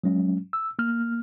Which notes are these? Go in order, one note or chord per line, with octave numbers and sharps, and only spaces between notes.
F#3 G#3 C#4
E6
A#3 F6